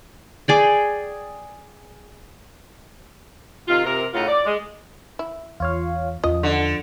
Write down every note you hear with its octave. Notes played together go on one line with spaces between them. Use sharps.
G#4 D5 G5
C3 D#3 F4
C3 A#4
A2 C#3 D#4 F4 F#5
D5
G#3
E4
E2 F4 C#5 F5
E2 F3 C#4 D#5
D3